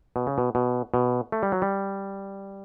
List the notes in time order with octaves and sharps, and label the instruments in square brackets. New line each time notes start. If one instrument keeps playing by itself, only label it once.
[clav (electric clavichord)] B2
C#3
B2
B2
B2
A3
G3
F#3
G3